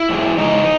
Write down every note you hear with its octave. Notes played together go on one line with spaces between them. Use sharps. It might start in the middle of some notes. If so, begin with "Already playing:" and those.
Already playing: E4
G#2 E3 G#3
E2 C#3 G#3 D#4